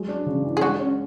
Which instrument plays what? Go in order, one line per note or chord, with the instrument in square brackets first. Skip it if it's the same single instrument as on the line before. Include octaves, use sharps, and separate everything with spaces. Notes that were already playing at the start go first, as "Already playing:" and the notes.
Already playing: [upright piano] F#3 G#3
D4
C#3
E3
[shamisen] G#4
[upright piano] G#3 [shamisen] D4 F#4
[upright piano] C#4